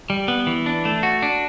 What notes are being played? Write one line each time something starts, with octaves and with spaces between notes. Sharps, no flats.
G3
B3
E3
D4
A3
F#4
D4